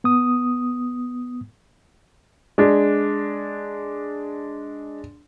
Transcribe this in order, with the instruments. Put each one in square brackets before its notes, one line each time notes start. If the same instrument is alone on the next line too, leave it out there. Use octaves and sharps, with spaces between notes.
[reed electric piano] B3 D#6
[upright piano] G#3 D4